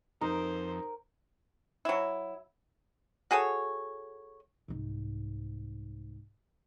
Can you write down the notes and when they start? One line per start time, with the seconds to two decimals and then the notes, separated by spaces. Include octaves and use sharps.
0.21 F2 D#4 A#4 C5
1.85 F#3 E4
3.31 F#4 G#4 A4 C#5
4.68 C2 G#2